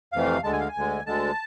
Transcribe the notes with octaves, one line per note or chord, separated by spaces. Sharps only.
F2 C3 E3 A3 F5
D2 D3 G#3 A5
G#5
F5
G#5
D2 D3 G#3
D2 D3 G#3 A5